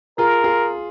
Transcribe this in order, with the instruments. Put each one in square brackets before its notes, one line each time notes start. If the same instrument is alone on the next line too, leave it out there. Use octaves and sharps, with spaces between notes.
[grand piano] F4 G#4 [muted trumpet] A#4
[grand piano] F4 G#4